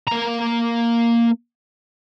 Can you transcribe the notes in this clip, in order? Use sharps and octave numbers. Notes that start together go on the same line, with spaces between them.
A#3 A#5